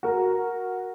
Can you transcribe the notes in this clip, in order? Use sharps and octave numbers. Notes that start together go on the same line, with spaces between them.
F#4 A#4